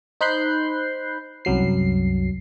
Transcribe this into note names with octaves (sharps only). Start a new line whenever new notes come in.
D#4 C5 B5 F#6 G6 C7
C2 F#2 F#3 C7